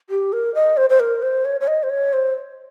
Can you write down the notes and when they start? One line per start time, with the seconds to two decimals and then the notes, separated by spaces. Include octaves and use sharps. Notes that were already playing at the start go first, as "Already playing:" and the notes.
0.10 G4
0.33 A#4
0.55 D#5
0.77 C5
0.90 C5
1.00 A#4
1.22 C5
1.45 C#5
1.60 C#5
1.67 D#5
1.83 C5
1.89 C#5
2.13 C5